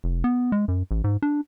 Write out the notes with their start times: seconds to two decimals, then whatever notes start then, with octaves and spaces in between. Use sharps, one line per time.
0.04 F1
0.24 B3
0.52 G#3
0.68 F#2
0.91 A1
1.04 G#2
1.22 D4